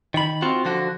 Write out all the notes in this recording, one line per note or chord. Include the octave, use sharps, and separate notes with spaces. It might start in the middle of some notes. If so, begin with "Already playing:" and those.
D#3 B5
C4 F4 F#4
D3 F3 F#4